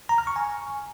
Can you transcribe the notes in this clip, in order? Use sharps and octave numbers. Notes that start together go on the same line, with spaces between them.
A#5
F6
C#6
G#5